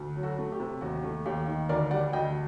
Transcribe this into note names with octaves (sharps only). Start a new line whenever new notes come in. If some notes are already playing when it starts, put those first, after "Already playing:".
Already playing: D2
F#3
F#4 A4
A3
G4
C3
D#2 F#4
A3
D#2 G4
D#3
D2 A#4 D5
G3 D5 F#5
D2 D#5 G5